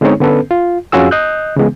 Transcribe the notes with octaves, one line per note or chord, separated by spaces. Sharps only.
D3 G#3 B3 C4 D#4 C#5
D3 B3 C#4 A4 B4
F4
F2 C#4 F4 F#4 G#4 E6
D#5 D#6 F#6 G6
C#3 E3 G#3 B3